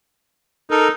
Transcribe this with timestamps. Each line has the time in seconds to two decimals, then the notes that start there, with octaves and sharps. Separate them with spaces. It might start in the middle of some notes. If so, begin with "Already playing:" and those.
0.71 D#4 A4 A#4